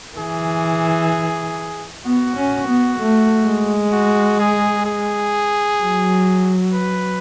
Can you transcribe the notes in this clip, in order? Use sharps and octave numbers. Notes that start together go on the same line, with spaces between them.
E3 G#4
B3 F#4
C#4
B3
A3
G#3
F#4
G#4
G#4
F#3
B4